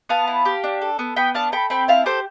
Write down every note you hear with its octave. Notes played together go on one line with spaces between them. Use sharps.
B3 F5 A5
E4
G4
D4
A4
B3
B3 G5 B5
D4 F5 A5
A4 G5 B5
C4 G5 B5
E4 F5 A5
G4 A4 C5